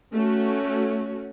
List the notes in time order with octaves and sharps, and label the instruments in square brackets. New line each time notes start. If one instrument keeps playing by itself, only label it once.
[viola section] A3 C#4 F#4